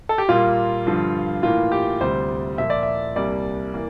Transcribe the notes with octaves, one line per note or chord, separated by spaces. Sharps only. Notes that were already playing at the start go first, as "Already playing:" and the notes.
A4
G4
A#2 G3 A#3 F4
G2 D3 F3
A2 E3 A#3 F4
G4
D2 C3 G3 C5
A#2 F3 A#3 E5
D5
E5
C2 C3 G3 A#3 D5
E3 A#3